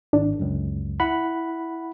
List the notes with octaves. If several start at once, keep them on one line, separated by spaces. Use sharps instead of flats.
G#1 D4
C#2 F#2
E4 F#5 B5